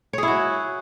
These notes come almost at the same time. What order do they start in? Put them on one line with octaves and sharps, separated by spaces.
C#5 G#4 E4 F#4